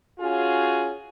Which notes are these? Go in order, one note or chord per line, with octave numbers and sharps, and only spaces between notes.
C#4 F4 F#4 G#4